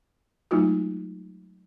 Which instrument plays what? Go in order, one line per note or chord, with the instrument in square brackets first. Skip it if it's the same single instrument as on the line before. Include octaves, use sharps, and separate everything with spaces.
[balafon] F#3 G#3 A3 D#4 F4 F#4